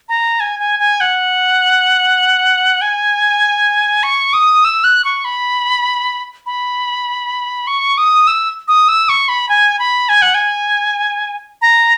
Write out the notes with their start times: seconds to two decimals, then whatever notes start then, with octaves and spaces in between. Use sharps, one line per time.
0.09 A#5
0.40 G#5
0.60 G#5
0.79 G#5
1.01 F#5
2.81 G#5
4.03 C#6
4.34 D#6
4.65 E6
4.84 F#6
5.05 C#6
5.25 B5
6.46 B5
7.67 C#6
7.98 D#6
8.27 E6
8.68 D#6
8.88 E6
9.09 C#6
9.29 B5
9.49 G#5
9.79 B5
10.09 G#5
10.22 F#5
10.34 G#5
11.62 A#5